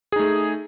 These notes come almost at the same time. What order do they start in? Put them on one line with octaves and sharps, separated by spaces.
G#4 D#4 A3